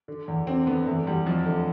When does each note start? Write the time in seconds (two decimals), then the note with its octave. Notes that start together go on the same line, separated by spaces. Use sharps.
0.08 D3
0.28 E2
0.47 D3 C4
0.67 D3 B3
0.87 E2 A3
1.07 E2 G3
1.26 F2 F3
1.46 D3 A3